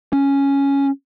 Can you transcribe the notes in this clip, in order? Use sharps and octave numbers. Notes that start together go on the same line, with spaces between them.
C#4